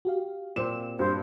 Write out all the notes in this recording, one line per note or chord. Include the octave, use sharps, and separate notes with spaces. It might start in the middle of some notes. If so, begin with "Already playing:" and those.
F#4 G4 F5
A#2 C4 E7
G2 C5